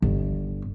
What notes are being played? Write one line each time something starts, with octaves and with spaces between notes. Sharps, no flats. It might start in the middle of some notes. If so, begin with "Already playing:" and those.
G1